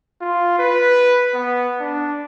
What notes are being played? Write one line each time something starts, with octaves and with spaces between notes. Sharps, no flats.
F4
B4
B3
D4